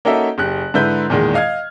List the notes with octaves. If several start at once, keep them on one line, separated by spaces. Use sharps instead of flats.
A#3 C#4 D#4 F#4 A4 E5
F#1 G4 F#6
G#2 D3 E4 B4 G6
E2 A#2 D#3 G#3
D#5 F5 F6 G#6